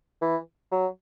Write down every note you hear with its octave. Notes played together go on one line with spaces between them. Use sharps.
E3
F#3